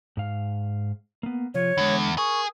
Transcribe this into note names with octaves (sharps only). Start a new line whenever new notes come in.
G#2 F5
A#3 B3
C3 F3 F4 C#5
E2 D3 G#3
G#4 A#4 C#6